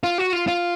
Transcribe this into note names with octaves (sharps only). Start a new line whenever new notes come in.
F4
F#4
F4
F4